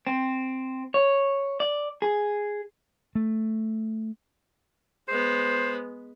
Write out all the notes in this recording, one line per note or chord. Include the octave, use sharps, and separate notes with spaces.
C4
C#5
D5
G#4
A3
G#3 B3 C5